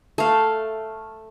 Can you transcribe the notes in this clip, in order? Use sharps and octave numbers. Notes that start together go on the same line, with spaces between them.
A3 F5